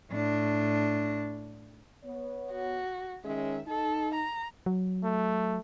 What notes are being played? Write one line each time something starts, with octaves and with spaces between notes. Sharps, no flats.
A2 D4
B3 C#5
F#4
D#3 G#3 C#4 E5
D#4 A4
A#5
F#3
A3